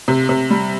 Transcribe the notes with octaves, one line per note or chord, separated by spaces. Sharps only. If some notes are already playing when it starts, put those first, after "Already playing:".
C3
C3
G3